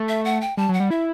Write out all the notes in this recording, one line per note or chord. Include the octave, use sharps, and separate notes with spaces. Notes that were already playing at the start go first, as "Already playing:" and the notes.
Already playing: A3
E5
F#5
G5
G3 A5
F#3
F#5
G3
E4 E5